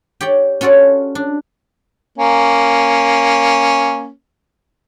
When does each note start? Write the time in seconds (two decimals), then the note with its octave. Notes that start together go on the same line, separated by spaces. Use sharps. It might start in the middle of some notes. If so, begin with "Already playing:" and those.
0.21 G4 C#5 D5 G5
0.61 C#4 F4 F#4 A4 D5
1.15 D4
2.18 A#3 C#4